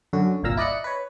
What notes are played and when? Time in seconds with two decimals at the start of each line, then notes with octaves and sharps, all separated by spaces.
0.13 F#2 D3 C#4 F#4
0.43 G1 C2 A#2 F5 A#5 E6
0.57 E4 D5 D#5 F#6 C#7
0.84 B4 C#5